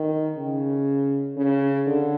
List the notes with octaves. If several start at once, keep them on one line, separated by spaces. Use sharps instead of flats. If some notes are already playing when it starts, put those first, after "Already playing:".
Already playing: D#3
C#3
C#3
D3